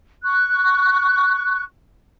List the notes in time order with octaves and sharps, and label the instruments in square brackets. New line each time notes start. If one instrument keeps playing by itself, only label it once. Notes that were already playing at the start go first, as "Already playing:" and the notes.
[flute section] C#6 F#6